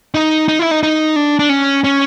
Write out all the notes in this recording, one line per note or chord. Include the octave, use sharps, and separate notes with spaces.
D#4
D#4
E4
D#4
D#4
D4
D4
C#4
C#4